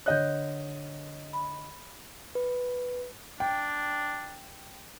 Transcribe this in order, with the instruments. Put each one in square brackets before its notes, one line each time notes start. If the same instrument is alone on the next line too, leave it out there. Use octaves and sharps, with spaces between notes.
[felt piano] D3 D#5 F#6 [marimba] C#5 G6
[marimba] B5
[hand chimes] B4
[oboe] D4 [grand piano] G5